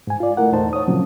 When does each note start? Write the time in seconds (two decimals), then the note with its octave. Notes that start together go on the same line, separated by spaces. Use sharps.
0.07 G#2 G#5
0.20 F4 D5
0.37 A3 E4 A#4 F#5
0.52 E2 A#2 A3 D#4 C5 A5
0.73 C#5 D#6
0.87 A#2 C#3 F3 F#3 C4 C#4